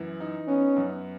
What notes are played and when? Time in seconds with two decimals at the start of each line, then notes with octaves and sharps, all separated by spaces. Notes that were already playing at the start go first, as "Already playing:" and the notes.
Already playing: F#2 E3
0.20 D#4
0.48 B3 C#4
0.76 F#2